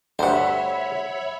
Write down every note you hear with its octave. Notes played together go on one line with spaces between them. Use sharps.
D2 G2 C5 C#5 E5 F#5 B5